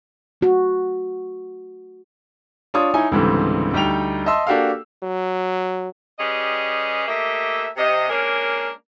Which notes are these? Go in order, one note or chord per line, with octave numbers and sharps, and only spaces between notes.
A3 F#4
D4 F4 C#5 D#6
D#4 E4 C#5 G#5
C#2 G#2 D3 E3 G3 C4
D2 G3 D#4 G5 F7
D#5 E5 A5 C6 E6
A#3 D4 F#4 G4 A4 F5
F#3
G3 C#4 G4 G#4 B4 D#5
A3 A#3 G4 D#5 E5
C3 D#5
G#3 A#3 C#4 D4 A#4